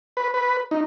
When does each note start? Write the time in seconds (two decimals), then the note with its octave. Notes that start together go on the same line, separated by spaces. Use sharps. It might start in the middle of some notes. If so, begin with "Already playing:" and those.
0.17 B4
0.34 B4
0.71 D#4